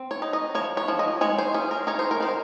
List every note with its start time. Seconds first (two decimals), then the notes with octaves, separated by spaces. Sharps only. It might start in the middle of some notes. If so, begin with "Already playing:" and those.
Already playing: C4
0.11 C#5
0.22 D#4
0.33 D#5
0.55 F3 C#5
0.77 C#5
0.88 F3
0.99 D#5
1.21 G#3 C#5
1.38 C5
1.54 C#4 G#4
1.71 A#4
1.87 D#4 C#5
1.99 C5
2.11 A#4
2.20 D#3 C5